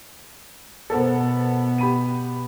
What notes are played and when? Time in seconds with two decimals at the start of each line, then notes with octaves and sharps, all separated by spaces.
0.90 B2 B3 A4 A#4 C5
1.78 G4 B5 D#7